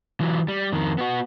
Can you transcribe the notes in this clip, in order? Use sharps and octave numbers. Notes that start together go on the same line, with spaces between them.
E3 F#3
G3
F2 D#3
B3 F#4